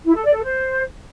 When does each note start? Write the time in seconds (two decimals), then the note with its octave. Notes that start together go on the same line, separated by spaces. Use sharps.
0.05 E4
0.15 A4
0.24 D5
0.33 A4
0.43 C5